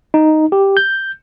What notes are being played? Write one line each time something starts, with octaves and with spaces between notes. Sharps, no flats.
D#4
G4
G6